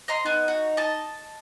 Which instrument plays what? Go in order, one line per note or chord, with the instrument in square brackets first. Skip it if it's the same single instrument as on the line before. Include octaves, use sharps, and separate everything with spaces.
[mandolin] D#5 A#5 C6
[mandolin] B3 [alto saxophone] D#4
[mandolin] F#4
D#5 A5